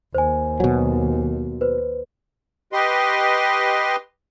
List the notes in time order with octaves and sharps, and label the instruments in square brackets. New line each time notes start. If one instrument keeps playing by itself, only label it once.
[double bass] D#2 [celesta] C5 G#5
[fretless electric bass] B2 F#3
[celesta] B4 C5
[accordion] G4 B4 D#5 C6